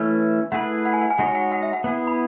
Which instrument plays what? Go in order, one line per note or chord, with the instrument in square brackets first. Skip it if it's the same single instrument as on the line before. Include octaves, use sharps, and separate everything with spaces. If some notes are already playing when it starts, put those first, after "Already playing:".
Already playing: [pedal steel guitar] E3 A3 C#4 E4 [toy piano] B4
[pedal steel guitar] A3 E4 G#4 B4 [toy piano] F#5
[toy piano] F#5
G#5
F#5
G#5
[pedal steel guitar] G#3 D#4 F#4 C#5 [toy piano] F#5
[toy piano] G#5
F#5
F#5
E5
F#5
[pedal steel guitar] B3 E4 G#4 [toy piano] F#5
[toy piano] B5